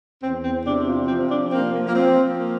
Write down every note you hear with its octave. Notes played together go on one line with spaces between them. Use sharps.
E2 C4
C4
C3 D4
F4
F3 C4
D4
A#3 C4
A#3
A#3
F3 C4
A#3